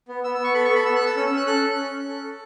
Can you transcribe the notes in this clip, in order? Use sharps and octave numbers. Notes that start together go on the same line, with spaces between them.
B3
B3 E6
E6
B3
C#6
A4 B5
C#6
A4 B5
B3 E6
F#6
A4
E6
C#4 E6
E6
C#4
F#6
A4 F#6
C#4
C#4
C#4
A4
A4